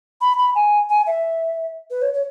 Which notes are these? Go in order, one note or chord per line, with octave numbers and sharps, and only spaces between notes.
B5
B5
G#5
G#5
E5
B4
C#5
C#5